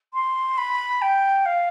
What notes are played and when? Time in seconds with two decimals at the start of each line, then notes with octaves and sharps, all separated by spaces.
0.13 C6
0.57 B5
1.01 G5
1.45 F5